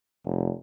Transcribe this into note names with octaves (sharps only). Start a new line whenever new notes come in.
F1